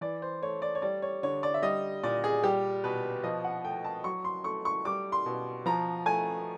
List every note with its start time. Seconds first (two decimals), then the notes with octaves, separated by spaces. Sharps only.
0.01 E3 D5
0.22 C5
0.42 A3 C#5
0.62 D5
0.75 C#5
0.82 G3 D5
1.02 C#5
1.23 D3 C#5
1.43 D5
1.54 E5
1.62 G3 D#5
2.03 A#2 D5
2.24 G#4
2.43 G3 G4
2.84 B2 B4
3.24 F3 D#5
3.44 F#5
3.64 A3 G5
3.84 A5
4.04 F#3 C#6
4.25 C6
4.44 A3 C#6
4.65 C#6
4.85 G3 D6
5.12 C6
5.26 B2
5.66 F3 A#5
6.06 A3 G#5